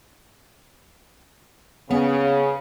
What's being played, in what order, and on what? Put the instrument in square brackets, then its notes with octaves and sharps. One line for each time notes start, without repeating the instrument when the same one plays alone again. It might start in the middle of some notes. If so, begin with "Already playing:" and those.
[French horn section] C#3 [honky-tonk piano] B3